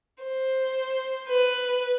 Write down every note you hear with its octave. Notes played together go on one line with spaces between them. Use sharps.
C5
B4